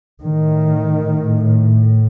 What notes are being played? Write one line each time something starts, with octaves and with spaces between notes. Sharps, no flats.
A2 D#3